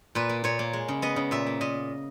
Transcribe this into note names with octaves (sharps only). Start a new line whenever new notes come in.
A#2 B4
A#3
A#2 C#5
A#3
G#3
C#3
B3 D#5
C#3
A#2 E5
A#3
A#2 D#5